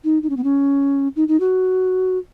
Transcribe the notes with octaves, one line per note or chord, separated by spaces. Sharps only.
D#4
D#4
C#4
B3
C#4
D#4
D#4
F#4